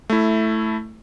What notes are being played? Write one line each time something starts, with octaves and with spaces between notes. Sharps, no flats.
A3 E4